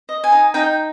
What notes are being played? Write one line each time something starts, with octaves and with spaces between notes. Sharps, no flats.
D#5
G#5
D#4
D#4 G5